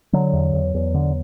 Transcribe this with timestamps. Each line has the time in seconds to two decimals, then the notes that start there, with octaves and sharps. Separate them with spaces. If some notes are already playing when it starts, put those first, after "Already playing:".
0.13 D3 F#3
0.33 E2
0.53 E2
0.74 E2
0.94 D3